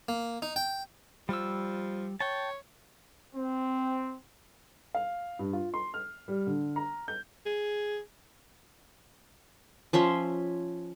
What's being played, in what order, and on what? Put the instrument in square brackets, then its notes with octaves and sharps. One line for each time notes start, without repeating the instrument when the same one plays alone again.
[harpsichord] A#3
D#4
G5
[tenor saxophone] F3 [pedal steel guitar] G3 E6
[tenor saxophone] C#5 [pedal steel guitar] G5 A5
[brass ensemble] C4
[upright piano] F5
G2
F4
C6
F6
G3
D3
A#5
G6
[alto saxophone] G#4
[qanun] F3 C#4 E5 C6